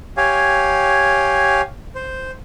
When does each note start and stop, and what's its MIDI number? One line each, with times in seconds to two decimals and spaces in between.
0.17 1.61 67
0.17 1.61 73
0.17 1.61 77
0.17 1.61 80
1.95 2.31 72